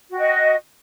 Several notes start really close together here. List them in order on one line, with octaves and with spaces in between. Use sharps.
F#4 G5 D#5